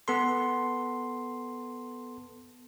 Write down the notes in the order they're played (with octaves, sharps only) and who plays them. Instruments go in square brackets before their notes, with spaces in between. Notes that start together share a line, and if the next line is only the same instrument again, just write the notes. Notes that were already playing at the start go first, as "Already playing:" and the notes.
[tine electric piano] B3 A4 C6